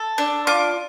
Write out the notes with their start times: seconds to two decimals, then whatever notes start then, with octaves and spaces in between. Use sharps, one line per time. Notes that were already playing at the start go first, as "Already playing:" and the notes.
Already playing: A4
0.18 D4
0.47 F4 D6